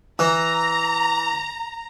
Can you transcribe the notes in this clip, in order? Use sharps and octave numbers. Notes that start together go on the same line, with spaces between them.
E3 A#5